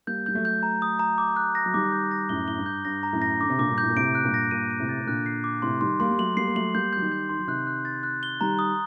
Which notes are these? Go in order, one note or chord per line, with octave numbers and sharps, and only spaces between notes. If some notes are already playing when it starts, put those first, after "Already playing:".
G3 A#3 G6
G3 G6
F#3 A3
G6
A#5
D#6
A#5
D6
F#6
A#6
F#3
D#3 G3 D6
G6
A#6
F#2 A2 G7
A2 G7
G2
G6
G2 A#6
A#5
F#2 A2
A#6
D3 D6
C3
A#2 D3 D6
G2 A#2
A2 G6
A#2
A2 C3 D7
F#6
G2 A#2
A#6
G2 A#2 D#7
D#7
A2 C3
A6
C3
A#2 D3 F#6
C7
D6
A2 C3 C6
D#3 G3 C6
G3 A#3 C6
G3
F#3 A3 F#7
G3 A#3 C7
A#3
F#3 A3 F#7
G3 A#3 G6
F#3 G6
D#3 G3
G6
D#3 C6
F#3
C3 D#3 F#6
F#6
A6
F#6
G7
D#3 G3 A#5
D#6